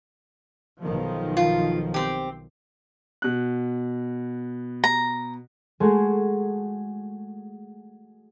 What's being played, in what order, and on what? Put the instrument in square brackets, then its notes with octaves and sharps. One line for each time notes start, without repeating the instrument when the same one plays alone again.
[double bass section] B1 D#3 F3
[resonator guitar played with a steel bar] F4
C4 G4
[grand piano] B2 F#6
[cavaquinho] A#5
[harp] G#3 A3 F#4 G#4